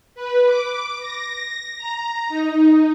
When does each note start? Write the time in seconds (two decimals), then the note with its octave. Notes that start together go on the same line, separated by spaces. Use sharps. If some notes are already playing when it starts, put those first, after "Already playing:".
0.15 B4
0.46 D6
1.00 A#6
1.78 A#5
2.28 D#4